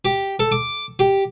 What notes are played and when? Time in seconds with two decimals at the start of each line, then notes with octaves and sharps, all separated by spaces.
0.05 G4
0.40 A4
0.52 D6
0.99 G4